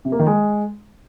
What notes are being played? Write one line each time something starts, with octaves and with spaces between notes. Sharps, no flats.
C3
A#3
D#3
G#3